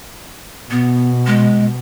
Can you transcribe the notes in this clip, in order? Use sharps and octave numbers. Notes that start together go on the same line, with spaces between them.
B2 B3
G#3